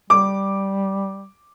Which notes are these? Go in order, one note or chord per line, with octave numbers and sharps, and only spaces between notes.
G3 D6